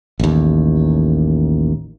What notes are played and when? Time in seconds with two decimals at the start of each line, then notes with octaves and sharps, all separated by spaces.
0.20 A1 D#2